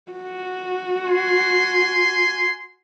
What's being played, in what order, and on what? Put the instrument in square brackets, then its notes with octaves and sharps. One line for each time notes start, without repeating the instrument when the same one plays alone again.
[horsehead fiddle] F#4
[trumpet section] G#5 C6